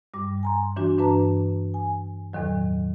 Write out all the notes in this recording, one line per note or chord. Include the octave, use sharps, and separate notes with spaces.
G2 G3 D6
G#5 A#5 C6
E3 D4 F#4
G2 D4 B4 A5 A#5
G#5
E2 A2 D#3 F#3